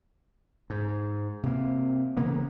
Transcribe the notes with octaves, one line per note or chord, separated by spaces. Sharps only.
G#2
C3 A#3
C#3 E3 A#3 B3